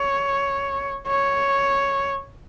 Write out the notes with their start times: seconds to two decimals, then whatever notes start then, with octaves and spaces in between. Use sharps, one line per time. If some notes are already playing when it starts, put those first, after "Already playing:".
Already playing: C#5
1.07 C#5